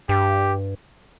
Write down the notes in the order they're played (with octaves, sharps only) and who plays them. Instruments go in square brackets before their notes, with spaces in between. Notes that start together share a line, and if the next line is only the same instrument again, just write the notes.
[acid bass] G2 [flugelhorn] G4